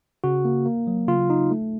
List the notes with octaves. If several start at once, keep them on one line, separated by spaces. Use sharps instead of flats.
C#3 F#4
A#3
A#3
F#3
C#3 F4
D#4
A3